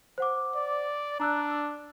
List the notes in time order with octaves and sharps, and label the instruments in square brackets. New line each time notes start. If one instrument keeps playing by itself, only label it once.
[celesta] C5 F#5 D6
[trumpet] D5
[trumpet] D4 [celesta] A#5 E6 F#6
[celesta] E6